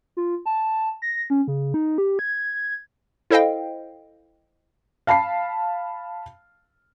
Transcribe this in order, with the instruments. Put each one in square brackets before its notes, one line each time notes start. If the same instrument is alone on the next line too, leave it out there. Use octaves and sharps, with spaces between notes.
[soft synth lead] F4
A5
A#6
C#4
C#3
D#4
G4
G#6
[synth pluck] E4 A4 C5 D#5 F5 G5
[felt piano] F5 A5 B5 C7